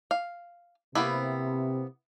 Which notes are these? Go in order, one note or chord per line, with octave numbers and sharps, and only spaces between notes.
F5
C3 A#3 B3 E4